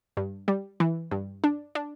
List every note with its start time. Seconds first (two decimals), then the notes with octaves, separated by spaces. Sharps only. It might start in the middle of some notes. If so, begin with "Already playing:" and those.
0.17 G2
0.48 G3
0.80 E3
1.11 G2
1.44 D4
1.75 D4